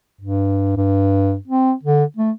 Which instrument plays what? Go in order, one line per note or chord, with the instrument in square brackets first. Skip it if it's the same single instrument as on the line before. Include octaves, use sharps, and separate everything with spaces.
[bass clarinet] G2
G2
C4
D3
A3